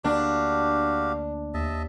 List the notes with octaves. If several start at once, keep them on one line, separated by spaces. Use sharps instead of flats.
D2 A#3 D4 F#4 G4 F5
D#2 D#5 E5 A5